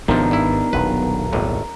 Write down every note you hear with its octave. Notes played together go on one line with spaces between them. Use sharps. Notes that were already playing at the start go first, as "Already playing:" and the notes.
G#1 C3 F3 B3 D4 D#4 A#4
G2 E4
D#1 B1 F#3 B4
G#1 D#2 A2